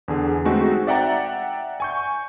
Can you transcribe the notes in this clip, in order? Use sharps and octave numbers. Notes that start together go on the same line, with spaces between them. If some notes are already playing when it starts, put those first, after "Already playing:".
E2 D3 G#4
G#3 A3 C4 D#4 F#4 A4
D5 E5 F#5 G5 A#5 A6
G#5 C#6 G6